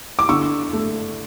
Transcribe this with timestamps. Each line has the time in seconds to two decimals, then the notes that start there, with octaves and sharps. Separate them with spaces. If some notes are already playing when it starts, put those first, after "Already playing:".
0.19 D6
0.29 D3 C#6 E6
0.73 A3